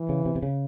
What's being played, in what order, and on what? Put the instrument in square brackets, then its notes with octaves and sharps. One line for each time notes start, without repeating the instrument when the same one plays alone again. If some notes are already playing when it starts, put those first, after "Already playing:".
Already playing: [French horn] E3
[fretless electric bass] C#3
C3
C3
C#3